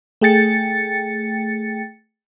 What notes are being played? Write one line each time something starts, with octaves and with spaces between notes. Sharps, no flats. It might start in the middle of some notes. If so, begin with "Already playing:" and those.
A3 G#4 G5 A6 C#7